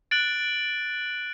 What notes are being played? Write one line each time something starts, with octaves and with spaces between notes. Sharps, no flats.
F#6 A6 D7 F#7